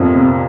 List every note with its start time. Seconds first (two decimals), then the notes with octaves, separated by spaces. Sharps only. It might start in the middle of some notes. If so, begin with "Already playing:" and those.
Already playing: F2 A#2 F3 A#3
0.15 C3